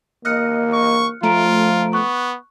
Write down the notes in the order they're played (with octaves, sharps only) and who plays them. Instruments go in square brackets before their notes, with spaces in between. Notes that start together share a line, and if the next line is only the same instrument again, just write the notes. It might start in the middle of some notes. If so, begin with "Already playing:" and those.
[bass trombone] A#3 [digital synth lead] D#5 [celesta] F6 F#6 C#7
[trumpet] C#6
[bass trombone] F3 [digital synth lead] A3 [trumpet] F4 [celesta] A#5 D7
[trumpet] B3 [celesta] C#6 F#6